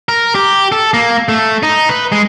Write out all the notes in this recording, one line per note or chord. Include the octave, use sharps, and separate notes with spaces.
A#4
G4
A4
A#3
A3
D#4
B4
G#3